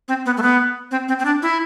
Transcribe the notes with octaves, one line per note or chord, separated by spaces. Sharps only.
C4
B3
A3
B3
C4
C4
C4
D4
E4